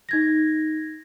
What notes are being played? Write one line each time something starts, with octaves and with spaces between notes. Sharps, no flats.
D#4 G#6 A#6